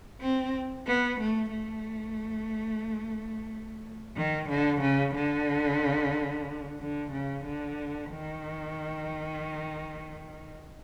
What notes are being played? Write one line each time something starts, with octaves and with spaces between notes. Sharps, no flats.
C4
B3
A3
A3
D#3
D3
C#3
D3
D3
C#3
D3
D#3